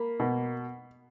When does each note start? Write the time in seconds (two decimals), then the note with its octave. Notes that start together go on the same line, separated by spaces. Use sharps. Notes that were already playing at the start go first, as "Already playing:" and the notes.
Already playing: A#3 B5
0.20 B2